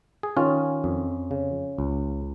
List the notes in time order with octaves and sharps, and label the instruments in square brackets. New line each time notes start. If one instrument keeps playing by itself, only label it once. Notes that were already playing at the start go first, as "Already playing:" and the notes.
[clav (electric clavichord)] G#4
D#3 C#4 F4
F2
C#3
C#2